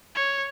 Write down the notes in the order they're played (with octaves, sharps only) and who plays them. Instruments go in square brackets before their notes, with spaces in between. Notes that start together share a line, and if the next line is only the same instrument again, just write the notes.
[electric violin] C#5